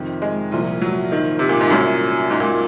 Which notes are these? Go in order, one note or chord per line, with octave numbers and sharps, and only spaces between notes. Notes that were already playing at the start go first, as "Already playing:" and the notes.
Already playing: F2 C3 D#3
G#3
C2 A#2 F3
F#3
D#3
C3
A#2
G#2
C2 F#2 A#2 F#3 C#4 F#4
G#2
A#2